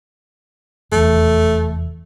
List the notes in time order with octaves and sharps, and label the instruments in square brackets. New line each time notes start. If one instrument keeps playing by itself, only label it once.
[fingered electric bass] F1 E2 [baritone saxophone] A3